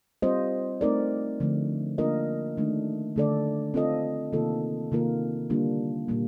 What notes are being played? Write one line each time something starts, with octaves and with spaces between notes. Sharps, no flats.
G3 C4 F4 C5 D#5
A3 C4 D#4 A#4 D5
D3 F3 A3
A#3 D4 F4 A#4 D#5
D#3 A3 D4
D3 A3 D4 A4 D5
C4 F4 A4 D#5
C3 D#3 A#3 F4 A4
C3 D#3 A#3 F4 A#4
D3 G3 A#3 D4 F4
A#2 G3 A#3